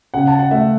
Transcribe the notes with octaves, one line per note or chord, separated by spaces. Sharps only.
C#3 F#5
A5
F#5
A3 E5